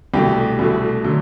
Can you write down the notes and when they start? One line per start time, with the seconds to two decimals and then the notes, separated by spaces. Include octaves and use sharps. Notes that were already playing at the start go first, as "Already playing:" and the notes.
0.14 C2 B2 A3 G4
0.59 C2 B2 A3
1.04 D3 F#3 A3